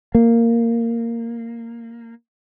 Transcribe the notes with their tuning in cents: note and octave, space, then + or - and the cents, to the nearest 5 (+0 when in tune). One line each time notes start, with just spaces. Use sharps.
A#3 -10